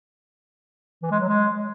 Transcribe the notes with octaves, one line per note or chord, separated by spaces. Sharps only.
E3
G#3
F#3
G#3